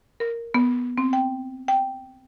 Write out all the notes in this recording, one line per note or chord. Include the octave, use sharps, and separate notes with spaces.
A#4
B3
C4
G5
G5